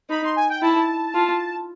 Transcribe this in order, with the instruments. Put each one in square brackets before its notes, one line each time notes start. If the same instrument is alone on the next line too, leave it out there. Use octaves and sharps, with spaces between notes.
[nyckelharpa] D#4 [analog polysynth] B5
[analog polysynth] C6
G#5
G5
[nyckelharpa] E4 [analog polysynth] A5
[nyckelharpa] F4